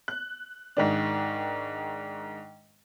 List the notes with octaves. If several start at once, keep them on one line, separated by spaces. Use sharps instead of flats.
F#6
G#2 D#3 D4